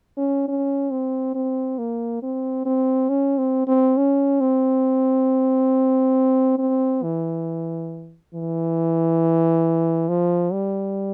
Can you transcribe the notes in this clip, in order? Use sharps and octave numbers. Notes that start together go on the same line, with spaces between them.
C#4
C#4
C4
C4
A#3
C4
C4
C#4
C4
C4
C#4
C4
C4
E3
E3
F3
G3